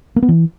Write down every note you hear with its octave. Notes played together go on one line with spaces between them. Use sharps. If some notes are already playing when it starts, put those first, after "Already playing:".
A#3
B3
E3